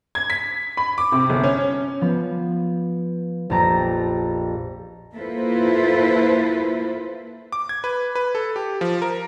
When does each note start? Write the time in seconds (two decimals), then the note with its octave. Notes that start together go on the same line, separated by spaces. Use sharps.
0.15 G#6
0.30 B6
0.77 B5
0.98 D6
1.12 C3
1.29 G1
1.44 C#4
2.01 F3 B3
3.50 A#1 F2 G4 A5 A#5
5.14 A#3 E4 F4 A4 B4 C5
7.52 D6
7.69 G#6
7.84 B4
8.15 B4
8.35 A4
8.56 G4
8.81 F3
9.02 A#4